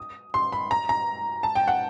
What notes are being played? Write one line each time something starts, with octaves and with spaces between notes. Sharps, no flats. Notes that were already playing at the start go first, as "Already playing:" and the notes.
Already playing: D#6
C6
B5
A#5
A#5
A5
G5
F#5